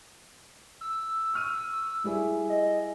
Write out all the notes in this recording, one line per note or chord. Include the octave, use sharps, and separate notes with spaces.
E6
C#6 F6 D#7
G3 E4 G#4
D#5